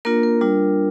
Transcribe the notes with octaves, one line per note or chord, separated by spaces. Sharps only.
A#3 D4 F4 A#4
A#4
G3 D4 F4